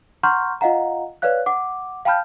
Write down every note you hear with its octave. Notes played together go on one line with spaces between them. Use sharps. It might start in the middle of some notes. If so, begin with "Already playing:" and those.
F#5 A#5 C6 C#6 F6 G6
F4 D#5 F5 F#5 A#5
B4 C#5 D5 F5 F#6
F#5 D6
F5 G5 A5 B5 F6 G6